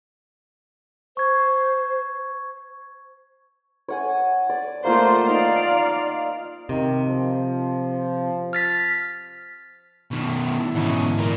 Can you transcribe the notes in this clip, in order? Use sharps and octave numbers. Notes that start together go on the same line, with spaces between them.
C5 C#6 G#6
C#5 F#5 G#5
D5
A3 A#3 F4 C5
D#4 D5 F5
C3 D#3
F3
F6 A6 B6
B2 D#3
E4 A5
G#2 B2 D3 E3 C#4
A#2 A#3